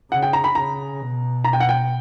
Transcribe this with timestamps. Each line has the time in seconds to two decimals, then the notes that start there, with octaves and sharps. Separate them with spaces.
0.11 C#3 F#5
0.22 G5
0.33 A#5
0.44 B5
0.55 C#3 A#5
1.00 B2
1.44 A#5
1.53 G5
1.60 F#5
1.69 G5